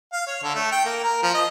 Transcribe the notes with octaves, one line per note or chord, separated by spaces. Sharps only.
F5
C#5
D3
A3
G5
A#3
A#4
F3
D#5